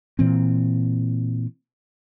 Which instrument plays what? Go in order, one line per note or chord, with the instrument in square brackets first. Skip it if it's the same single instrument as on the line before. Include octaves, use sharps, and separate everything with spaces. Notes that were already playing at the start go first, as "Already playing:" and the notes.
[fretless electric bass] A#2 E3 C4